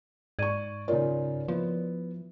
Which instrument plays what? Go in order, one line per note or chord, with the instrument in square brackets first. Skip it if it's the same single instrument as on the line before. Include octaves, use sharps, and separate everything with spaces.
[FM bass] G#2 [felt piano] D5 C#6 [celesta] G#6 D#7
[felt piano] C#3 D#4 F4 [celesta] A#4 C#5 D5
[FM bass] F3 [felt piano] B3 E4